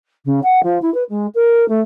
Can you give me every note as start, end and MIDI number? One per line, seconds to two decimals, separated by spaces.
0.25 0.39 49
0.43 0.62 78
0.63 0.78 53
0.81 0.92 64
0.94 1.03 71
1.09 1.26 56
1.34 1.66 70
1.68 1.80 57